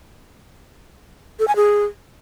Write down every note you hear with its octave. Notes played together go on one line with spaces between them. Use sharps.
A4
G#5
G#4